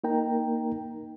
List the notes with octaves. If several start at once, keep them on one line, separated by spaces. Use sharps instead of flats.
A#3 D#4 A#4 G5 A#5